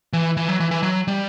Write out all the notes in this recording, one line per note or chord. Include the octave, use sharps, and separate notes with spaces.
E3
E3
F#3
E3
E3
F#3
G3